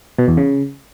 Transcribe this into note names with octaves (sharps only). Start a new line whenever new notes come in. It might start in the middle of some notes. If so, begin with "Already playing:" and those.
B2
E2
C#3